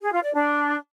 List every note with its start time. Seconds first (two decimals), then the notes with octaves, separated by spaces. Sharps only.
0.01 G#4
0.12 F4
0.23 D5
0.33 D4